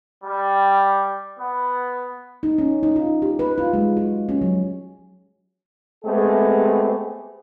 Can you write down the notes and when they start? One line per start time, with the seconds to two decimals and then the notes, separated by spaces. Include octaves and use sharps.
0.24 G3
1.38 B3
2.43 D#4
2.58 C#4
2.83 D#4
2.96 F4
3.22 G4
3.39 B4
3.58 F4
3.73 G#3
3.97 F#4
4.29 C#4
4.41 F#3
6.05 G#3 A3 B3 C4 G4 G#4